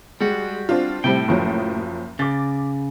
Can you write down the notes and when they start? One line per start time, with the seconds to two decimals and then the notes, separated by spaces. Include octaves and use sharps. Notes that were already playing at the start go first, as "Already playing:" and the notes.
0.21 G3 G#3 F#4
0.69 C4 D4 F4
1.04 A2 C3 G3 C4 G5
1.28 F#1 F3 F#3
2.19 C#3 D6 A6